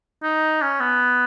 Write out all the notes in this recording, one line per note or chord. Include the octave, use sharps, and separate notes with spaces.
D#4
C#4
B3